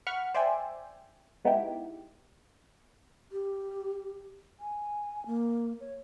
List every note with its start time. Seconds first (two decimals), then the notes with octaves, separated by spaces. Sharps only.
0.07 F#5 B5 C#6 F6
0.34 C5 D5 E5 G5 G#5
1.45 G#3 B3 D#4 E4 G4
3.32 G4
4.60 G#5
5.26 A#3
5.80 C#5